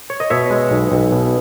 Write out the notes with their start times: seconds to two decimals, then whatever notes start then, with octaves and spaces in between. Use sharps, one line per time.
0.10 C#5
0.20 D#5
0.30 B2 C#5 E5
0.50 G#3
0.71 B1
0.92 B1
1.12 B2